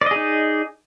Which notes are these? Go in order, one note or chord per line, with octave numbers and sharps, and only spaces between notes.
D#4 G#4 D5 D#5